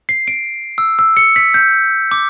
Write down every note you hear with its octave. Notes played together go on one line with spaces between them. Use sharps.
C7
D7
E6
E6
C#7
B6
G6
D6